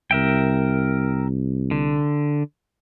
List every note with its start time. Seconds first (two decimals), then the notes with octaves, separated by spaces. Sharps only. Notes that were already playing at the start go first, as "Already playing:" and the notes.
0.11 C2 A#4 E5 G5
1.71 D3